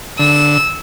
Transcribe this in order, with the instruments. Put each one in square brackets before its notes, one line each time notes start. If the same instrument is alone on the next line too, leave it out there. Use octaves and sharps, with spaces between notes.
[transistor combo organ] D3 [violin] E6